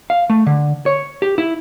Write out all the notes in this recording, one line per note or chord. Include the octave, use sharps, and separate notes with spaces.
F5
A3
D3
C#5
G4
E4